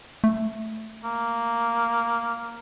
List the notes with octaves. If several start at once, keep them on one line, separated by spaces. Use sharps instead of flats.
A3
A#3